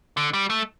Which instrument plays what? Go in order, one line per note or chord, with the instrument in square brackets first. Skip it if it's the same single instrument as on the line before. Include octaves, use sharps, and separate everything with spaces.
[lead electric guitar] D3
G3
A3